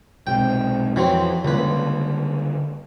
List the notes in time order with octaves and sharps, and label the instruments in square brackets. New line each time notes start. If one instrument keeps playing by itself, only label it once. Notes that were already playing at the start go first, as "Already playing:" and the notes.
[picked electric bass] B1 G#2 C3 [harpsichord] G5
[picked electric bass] F2 [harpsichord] E3 F#3 C4
[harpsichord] C#2 B4 [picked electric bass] D3 G3 A#3